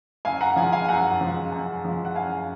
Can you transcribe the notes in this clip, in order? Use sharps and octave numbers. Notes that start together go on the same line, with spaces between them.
F#2 F5 G#5
F#5 A#5
F3 G#3 F5 G#5
F5 G#5
F#2 F#5 A#5
F3 G#3
F#2
F3 G#3
F#5
F#2 F5 G#5